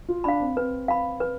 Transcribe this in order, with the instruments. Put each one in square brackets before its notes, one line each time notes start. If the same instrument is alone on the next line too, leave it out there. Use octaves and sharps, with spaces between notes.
[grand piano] F4
[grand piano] D4 [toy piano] F5 B5
[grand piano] C4
[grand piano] C4 [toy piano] B4
[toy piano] F5 B5
B4